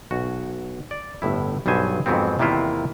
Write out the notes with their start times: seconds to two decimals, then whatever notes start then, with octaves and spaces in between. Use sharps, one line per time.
0.11 B1 F#4
0.91 D5
1.22 G1 A2 E4
1.66 B1 G2 F#3 B3 C5 G#5
2.06 F2 G#2 F#3 B3 C4
2.39 E2 C3 D#3 A#3 E4 F4